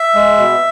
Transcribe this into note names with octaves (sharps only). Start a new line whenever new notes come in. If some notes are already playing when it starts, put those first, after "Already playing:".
Already playing: E5
G#3
B2